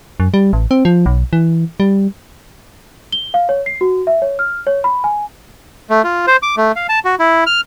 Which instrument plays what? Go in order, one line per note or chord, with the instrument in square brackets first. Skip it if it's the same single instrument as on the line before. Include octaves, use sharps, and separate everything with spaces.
[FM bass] F#2
G3
A1
C4
F3
B1
E3
G3
[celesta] G7
F5
C#5
C7
F#4
E5
C#5
F6
C#5
B5
G#5
[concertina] A3
F4
C5
D6
A3
F5
A5
F#4
E4
F6